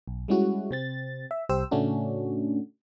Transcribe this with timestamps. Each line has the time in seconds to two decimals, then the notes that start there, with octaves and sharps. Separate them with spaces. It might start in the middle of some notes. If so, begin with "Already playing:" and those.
0.08 B1
0.28 G3 G#3 C#4 E4 F#4
0.71 C3 C4 A6
1.31 E5
1.49 C2 G4 C5 E6
1.71 A2 C#3 A3 C#4 D4 F#4